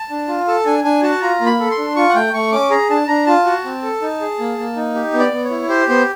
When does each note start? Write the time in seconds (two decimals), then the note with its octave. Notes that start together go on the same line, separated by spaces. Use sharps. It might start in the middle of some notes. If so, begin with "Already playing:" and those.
Already playing: A5
0.10 D4
0.28 F4
0.47 A4 A5
0.65 D4 G#5
0.84 D4 G#5
1.02 F#4 A5
1.22 F4 A#5
1.40 A#3
1.46 B5
1.60 A4
1.71 C6
1.78 D4
1.96 F4 C#6
2.09 F#5
2.15 A3 G5
2.34 A3 C#6
2.52 C#4 D6
2.70 G#4 A#5
2.90 D4 A5
3.08 D4 A#5
3.26 F4 A5
3.45 F#4
3.65 C4
3.83 A4
4.02 D#4
4.21 G#4
4.39 A#3
4.58 A#3
4.76 D#4
4.95 G4
5.13 B3
5.19 D5
5.32 B3
5.44 C#5
5.50 E4
5.69 G4 C5
5.89 B3 C5